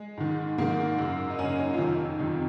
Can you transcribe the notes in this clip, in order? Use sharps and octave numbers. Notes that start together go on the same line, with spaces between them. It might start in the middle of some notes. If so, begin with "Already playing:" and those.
Already playing: G#3
G#2 D#3
G#2 D#3 A#3
F#2 C#3
D#4
F#2 C#3 C#4
C#4
F4
F2 C3 D#3 D#4
F2 C3 D#3